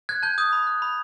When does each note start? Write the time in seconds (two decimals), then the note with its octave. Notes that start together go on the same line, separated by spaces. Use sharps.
0.09 F#6 G#6
0.23 A5 G6
0.38 D#6 G6
0.53 B5
0.67 F#6
0.82 B5